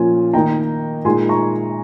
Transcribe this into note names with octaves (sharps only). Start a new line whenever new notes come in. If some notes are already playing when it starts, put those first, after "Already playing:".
Already playing: A#2 F3 A#3 C#4 F4 G#5
D#3 A#3 D#4 G5 A#5
A#2 G#3 D#4 G#5 C6
A#5 C#6